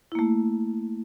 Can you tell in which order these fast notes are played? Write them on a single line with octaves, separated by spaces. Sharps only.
E4 A#3 A3